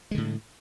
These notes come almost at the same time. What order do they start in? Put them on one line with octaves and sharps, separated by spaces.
G#3 D3 A2